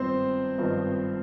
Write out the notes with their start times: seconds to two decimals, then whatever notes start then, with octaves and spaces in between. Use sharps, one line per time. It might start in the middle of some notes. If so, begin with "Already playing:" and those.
Already playing: G#1 G2 F3 B3 C4 D#4 C5
0.58 G#1 G2 F3 B3 D#4